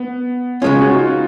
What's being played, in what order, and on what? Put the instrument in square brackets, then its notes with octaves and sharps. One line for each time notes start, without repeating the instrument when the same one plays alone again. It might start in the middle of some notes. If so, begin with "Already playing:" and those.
Already playing: [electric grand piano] B3
[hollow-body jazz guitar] C#3 G#3 C#4 [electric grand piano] F4
[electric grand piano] F#4
D#4
F4